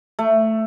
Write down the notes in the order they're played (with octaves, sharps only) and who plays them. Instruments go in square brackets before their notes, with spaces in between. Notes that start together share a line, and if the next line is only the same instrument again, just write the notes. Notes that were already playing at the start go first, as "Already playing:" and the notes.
[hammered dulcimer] A3